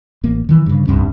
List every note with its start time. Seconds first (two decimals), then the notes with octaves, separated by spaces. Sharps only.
0.24 A1 A#3
0.49 D#3 E3
0.66 G2 C#3
0.87 D1 C2 G2 C#4